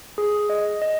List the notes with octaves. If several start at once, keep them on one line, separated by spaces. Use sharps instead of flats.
G#4
D#5
D#5